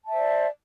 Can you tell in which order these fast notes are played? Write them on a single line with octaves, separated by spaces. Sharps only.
A5 E5 C5 D5